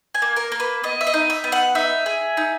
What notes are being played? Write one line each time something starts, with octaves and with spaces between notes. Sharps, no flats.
G#5
A#3
A#4
A#3
B4
B3 D#5
E5
D#5
D#4
E5
B3
F#5
D#4 E5
G#4
D#4